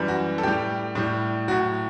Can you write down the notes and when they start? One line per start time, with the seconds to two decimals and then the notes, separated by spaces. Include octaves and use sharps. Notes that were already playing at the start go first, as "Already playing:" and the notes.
Already playing: F#2 E3 G3
0.08 F#4
0.38 A4
0.43 A2 G3 G4
0.95 A2 G3
1.48 F#3 F#4
1.51 A2